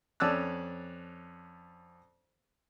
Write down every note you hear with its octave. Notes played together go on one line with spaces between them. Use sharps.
F2 C#4 D5 A5 E6 F#6